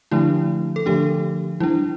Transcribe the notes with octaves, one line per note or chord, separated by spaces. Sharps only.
D3 F3 A3 D4 E4
A4
D3 F3 A3 D4 G4
E3 G3 D4 E4